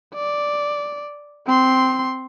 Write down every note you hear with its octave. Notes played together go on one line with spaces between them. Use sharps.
D5
C4 C6